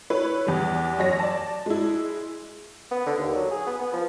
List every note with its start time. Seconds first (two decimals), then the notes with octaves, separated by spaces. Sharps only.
0.10 E4 B4 C#5
0.46 E2 G3
0.99 F#2 C#5 A#6
1.19 D5 A5
1.66 G#3 E4
2.91 B3
3.06 D3
3.19 D#2
3.36 F#3
3.51 G#4
3.67 B3
3.81 B3
3.93 F3